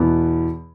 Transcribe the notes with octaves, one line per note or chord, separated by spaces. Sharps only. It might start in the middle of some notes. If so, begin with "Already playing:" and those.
Already playing: E2 B2 B3